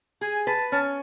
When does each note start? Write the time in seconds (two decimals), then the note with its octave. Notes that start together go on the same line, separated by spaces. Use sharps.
0.21 G#4 G#5
0.47 B4 A5
0.72 C#4 A5